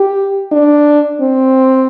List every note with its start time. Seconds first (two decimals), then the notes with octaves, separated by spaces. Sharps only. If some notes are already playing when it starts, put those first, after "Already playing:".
Already playing: G4
0.52 D4
1.21 C4